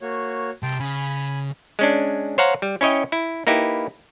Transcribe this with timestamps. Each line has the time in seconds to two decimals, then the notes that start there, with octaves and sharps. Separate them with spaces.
0.01 A#3 F#4 C#5
0.63 C2 G5 A5 C6
0.80 C#3 G#5 B5
1.79 G#3 C#4 D4
2.38 C5 C#5 F5 F#5 A#5
2.62 G3
2.81 C#4 E4 C#5 D#5 G5
3.12 E4
3.47 A#3 D#4 E4 G4 B4